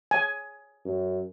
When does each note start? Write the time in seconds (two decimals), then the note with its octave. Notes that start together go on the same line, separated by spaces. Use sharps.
0.11 G#5
0.85 F#2